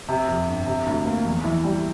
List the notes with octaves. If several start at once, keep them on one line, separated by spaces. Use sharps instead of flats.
C3
F2
G1
C3
D2
A#3
E2
E3
G3